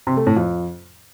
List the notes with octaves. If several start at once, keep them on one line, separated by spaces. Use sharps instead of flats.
C3
A3
A2
F2